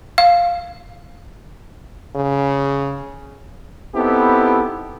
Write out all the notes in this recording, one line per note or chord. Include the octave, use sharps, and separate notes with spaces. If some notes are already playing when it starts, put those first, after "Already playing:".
F5
C#3
B3 C4 D#4 E4 G4 A4